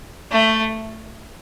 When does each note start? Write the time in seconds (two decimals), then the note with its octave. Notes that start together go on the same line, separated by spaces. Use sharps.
0.32 A3